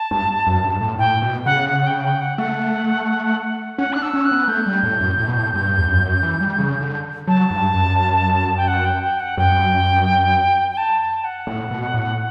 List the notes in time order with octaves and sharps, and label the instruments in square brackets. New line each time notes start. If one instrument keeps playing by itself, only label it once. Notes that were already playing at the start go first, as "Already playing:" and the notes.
Already playing: [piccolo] A5
[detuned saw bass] G2
F#2
G2
A2
[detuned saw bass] A2 [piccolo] G5
[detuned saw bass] B2
[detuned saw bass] C#3 [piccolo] F#5
[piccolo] F#5
F#5
G5
G5
F#5
[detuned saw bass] A3 [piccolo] F#5
[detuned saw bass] C#4 [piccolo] F#5
[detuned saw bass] D4 [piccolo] F#6
[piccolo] E6
[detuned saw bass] C#4
[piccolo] F#6
[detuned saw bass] B3
[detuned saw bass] A3 [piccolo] G6
[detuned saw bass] G3
A2
F#2
A2
B2
A2
G2
E2
F#2
F#2
E3
G3
C#3
D3
[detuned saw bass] F#3 [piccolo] A5
[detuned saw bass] G2
F#2
[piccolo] G5
F#5
G5
G5
F#5
[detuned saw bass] F#2 [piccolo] G5
[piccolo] G5
A5
A5
F#5
[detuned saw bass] A2
B2
A2